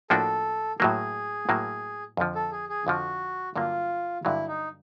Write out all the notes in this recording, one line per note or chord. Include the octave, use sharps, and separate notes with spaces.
A2 F3 A#3 D4 F#4 A4
A2 F#3 A#3 G#4
A2 F#3 A#3
F2 D3 F3
A4
G#4
G#4
F2 D3 F3 F#4
G2 D3 F#3 A#3 F4
G2 D3 F#3 A#3 E4
D#4